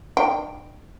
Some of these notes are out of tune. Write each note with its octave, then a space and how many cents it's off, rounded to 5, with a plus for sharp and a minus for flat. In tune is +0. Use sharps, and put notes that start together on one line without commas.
D4 +40 G5 +0